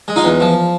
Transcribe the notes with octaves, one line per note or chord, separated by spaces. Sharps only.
G#3
D#4 F4
E2
F3